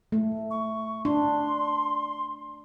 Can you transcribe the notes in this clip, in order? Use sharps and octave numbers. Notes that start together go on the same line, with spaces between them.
A3
C#6
D4 C6